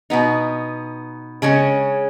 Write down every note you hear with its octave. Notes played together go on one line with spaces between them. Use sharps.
B2 B3 D#4
C#3 G#3 C#4